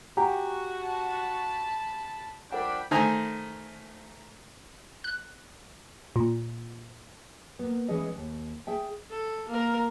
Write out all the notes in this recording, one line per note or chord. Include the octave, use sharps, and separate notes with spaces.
F#4 G4 F#5 G#5 A#5
A5 B5
F3 G3 D4 A#4 F#5 G5 B5 D6
D#3 A3 C5 G#5 A#5 D#6
F#6
A#2
A#3 B3
E3 G#3 B3 C#4 G#4 D#5
D#2
G#4 E5 G5
A4
A#3 A#4